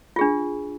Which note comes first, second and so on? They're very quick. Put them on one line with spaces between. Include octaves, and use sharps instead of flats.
F4 G#4 D4